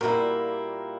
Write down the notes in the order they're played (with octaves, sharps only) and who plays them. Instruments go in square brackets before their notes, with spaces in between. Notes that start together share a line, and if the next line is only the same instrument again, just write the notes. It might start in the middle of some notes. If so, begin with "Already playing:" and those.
[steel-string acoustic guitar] A#2 G3 A#3 E4 [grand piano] F#4 A#4